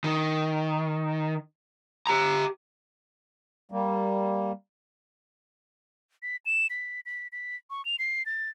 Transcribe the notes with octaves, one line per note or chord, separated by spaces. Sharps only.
D#3
G4 A#5
G3 A#3
B6
E7
B6
B6
B6
C#6
F7
C7
A6